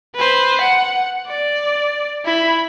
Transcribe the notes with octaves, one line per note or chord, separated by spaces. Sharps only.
B4 C5
F#5
D5
E4 B5